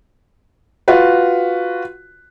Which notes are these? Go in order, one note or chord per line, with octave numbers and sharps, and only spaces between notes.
F4 F#4 B4